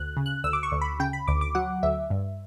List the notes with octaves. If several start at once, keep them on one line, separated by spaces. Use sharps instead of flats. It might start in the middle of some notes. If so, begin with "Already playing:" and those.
Already playing: D2 F#6
C#3
F#6
D2 E6
D6
C#6
D2
B5
C#3 G5
B5
D2 D6
D6
F#3 F#5
D2 E5
G2